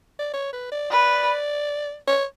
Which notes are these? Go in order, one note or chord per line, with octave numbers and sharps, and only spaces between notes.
D5
C#5
B4
D5
B4 D5
C#5